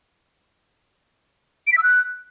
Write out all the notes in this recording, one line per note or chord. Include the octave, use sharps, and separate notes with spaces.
D7
B6
E6
F#6